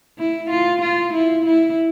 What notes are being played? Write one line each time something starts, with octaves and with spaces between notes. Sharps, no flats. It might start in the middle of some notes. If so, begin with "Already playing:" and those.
E4
F4
F4
E4
E4